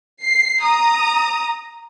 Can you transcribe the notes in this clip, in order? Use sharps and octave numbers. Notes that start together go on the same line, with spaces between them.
C7
A#5 D#6